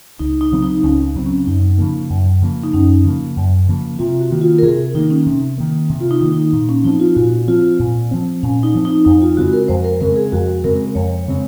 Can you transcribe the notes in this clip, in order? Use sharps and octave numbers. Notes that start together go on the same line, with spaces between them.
C#2 D#4
D#4
C#3 F#3 C4
D#4
C#2 C#4
C#3 F#3 C4
C#4
F#2 D#4
C#3 F3 A#3
F#2
C#3 F3 A#3
D#4
F#2 C#4
C#3 F3 A#3
F#2
C#3 F3 A#3
C3 F4
F#4
D#3 A#3
F4
A#4
C3 G#4
D#3 A#3 D#4
C#4
C3
D#3 A#3
C3
F4
D#4
D#3 A#3
D#4
A#2
C#4
F3 C4 D#4
F4
A#2 F#4
F3 C4 F4
A#2
F3 C4
A#2 C#4
D#4
F3 C4
D#4
F2 D#4
F4
C#3 G#3 C4 F#4
A#4
F2 C5
A#4
C#3 G#3 C4 A#4
G#4
F2 F#4
C#3 G#3 C4 A#4
F2 C#5
C#3 G#3 C4